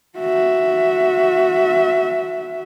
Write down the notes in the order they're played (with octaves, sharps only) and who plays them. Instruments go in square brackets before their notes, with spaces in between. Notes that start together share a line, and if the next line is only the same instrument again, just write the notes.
[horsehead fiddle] F#4 E5